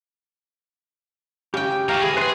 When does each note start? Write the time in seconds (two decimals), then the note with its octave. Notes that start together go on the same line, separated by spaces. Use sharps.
1.54 C#3 G4 G5
1.89 A#3 C#5 G5
2.02 E3 G#4
2.17 D4 B4 C6